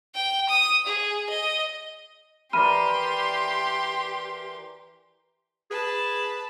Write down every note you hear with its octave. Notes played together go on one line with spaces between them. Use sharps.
G5
D#6
G#4
D#5
E3 G4 A#4 D5 B5 C6 F6 D#7
G#4 B4 A5